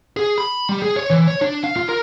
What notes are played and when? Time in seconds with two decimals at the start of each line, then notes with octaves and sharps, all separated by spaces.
0.17 G#4
0.38 B5
0.69 G3
0.82 G#4
0.97 C#5
1.10 E3
1.28 C#5
1.42 D4
1.64 F5
1.77 F4
1.89 A#4